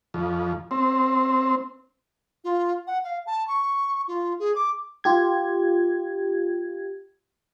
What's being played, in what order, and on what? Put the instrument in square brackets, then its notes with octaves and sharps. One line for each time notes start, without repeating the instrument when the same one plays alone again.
[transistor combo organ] F2
C4
[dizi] F4
F#5
F5
A5
C#6
F4
G#4
D6
[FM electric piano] F4 G4 G#6